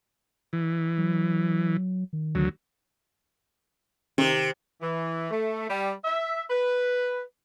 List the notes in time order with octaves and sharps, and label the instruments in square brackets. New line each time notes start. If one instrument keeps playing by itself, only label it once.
[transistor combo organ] E3
[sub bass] F#3
D#3
[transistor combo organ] D2 F#3
[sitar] C3 [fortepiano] D#3
[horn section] E3
A3
G3
E5
B4